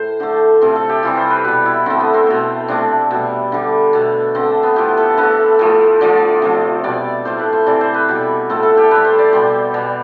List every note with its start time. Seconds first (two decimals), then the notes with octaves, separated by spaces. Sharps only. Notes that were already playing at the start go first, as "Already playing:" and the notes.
Already playing: A2 C5
0.20 D3 A3
0.62 C3 F3 A3
0.75 A4
0.89 G4
1.03 C3 E3 G3 F4
1.17 C5
1.30 B4
1.44 B2 G3 B4
1.66 E4
1.86 D3 A3 C4
2.00 B3
2.14 C4
2.27 B2 A3
2.68 C3 F3 A3 D4
3.11 B2 G3
3.52 D3 G3
3.93 B2 A3
4.35 D3 A3 C4
4.63 B3
4.76 A2 F3 A3 G4
4.97 A4
5.18 D3 A3 B4
5.59 A2 F3 A3
6.01 D3 F3 A3 D5
6.42 C3 F3 A3
6.84 B2 G3 D5
7.25 A2 F3 A3 C5
7.39 B4
7.53 C5
7.66 C3 E3 A3 D5
7.81 C5
7.94 B4
8.09 B2 G3
8.49 A2 F3 A3 A4
8.63 A4
8.77 G4
8.91 A2 G3 B4
9.05 C5
9.19 D5
9.33 B2 G3 C5
9.74 B2 G3